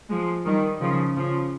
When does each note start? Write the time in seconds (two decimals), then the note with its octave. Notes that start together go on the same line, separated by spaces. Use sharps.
0.10 F3 G#3
0.45 D#3 G3
0.81 C#3 F3
1.16 C#3 F3